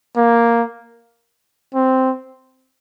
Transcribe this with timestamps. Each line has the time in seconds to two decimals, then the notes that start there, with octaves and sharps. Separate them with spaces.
0.17 A#3
1.74 C4